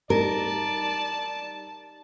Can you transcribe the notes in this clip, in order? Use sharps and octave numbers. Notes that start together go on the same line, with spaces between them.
G3 D#4 A#4 D5 A5